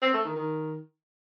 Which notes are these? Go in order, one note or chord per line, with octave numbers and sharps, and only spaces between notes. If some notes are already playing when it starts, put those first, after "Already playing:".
C4
A3
D#3
D#3